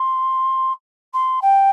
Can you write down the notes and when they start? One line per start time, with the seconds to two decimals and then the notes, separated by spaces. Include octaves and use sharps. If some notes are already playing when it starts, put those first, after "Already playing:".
Already playing: C6
1.13 C6
1.41 G5